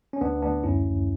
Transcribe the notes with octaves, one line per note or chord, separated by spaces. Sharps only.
C#4
D2 B3 D4
D2 B3 D4
F#2 C#4 E4
G#1